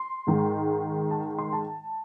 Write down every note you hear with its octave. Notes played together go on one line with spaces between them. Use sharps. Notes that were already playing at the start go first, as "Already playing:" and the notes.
Already playing: C6
G#2 D#3 G#3
A5
C6
A5